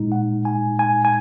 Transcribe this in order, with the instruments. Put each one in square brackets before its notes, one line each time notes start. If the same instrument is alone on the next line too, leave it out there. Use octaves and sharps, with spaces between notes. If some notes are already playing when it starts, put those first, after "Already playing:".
Already playing: [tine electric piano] A#2 G#3 D#4
F#5
G#5
G#5
G#5